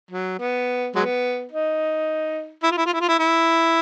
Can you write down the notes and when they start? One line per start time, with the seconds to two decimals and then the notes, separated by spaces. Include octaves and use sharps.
0.11 F#3
0.39 B3
0.95 F#3 G#3 B3
1.52 D#4
2.63 E4
2.71 F4
2.78 E4
2.86 F4
2.93 E4
3.01 F4
3.08 E4
3.19 E4